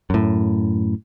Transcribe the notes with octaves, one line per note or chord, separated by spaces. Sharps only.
F#2 A2